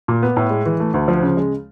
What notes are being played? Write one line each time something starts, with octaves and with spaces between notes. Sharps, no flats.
A#2
B3
A2
G#3
E3
A3
D2
F3
C#3
G#3